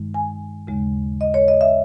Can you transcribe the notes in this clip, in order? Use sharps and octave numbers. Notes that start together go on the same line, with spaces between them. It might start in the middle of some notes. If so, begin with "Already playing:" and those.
Already playing: G2 D#3 G#3 D#4
G#5
D#2 C#3 G#3
D#5
C#5
D#5
E5